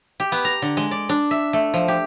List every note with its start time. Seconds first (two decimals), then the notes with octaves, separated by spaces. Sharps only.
0.20 G4
0.32 B3
0.45 A#5
0.62 D3
0.77 G#3
0.91 D5
1.09 D4
1.31 E5
1.53 A3
1.74 F3
1.88 G4